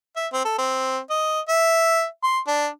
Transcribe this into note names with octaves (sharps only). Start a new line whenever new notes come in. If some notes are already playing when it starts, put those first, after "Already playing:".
E5
C4
A4
C4
D#5
E5
C6
D4